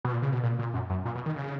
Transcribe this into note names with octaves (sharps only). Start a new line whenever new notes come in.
B2
A#2
C#3
B2
A#2
A#2
F#2
F#2
A#2
B2
D#3
C#3